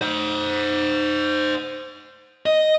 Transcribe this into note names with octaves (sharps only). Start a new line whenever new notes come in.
C5 F#5
D#5